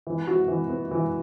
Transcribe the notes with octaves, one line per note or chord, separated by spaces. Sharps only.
E3
F#4
E3
B3
E3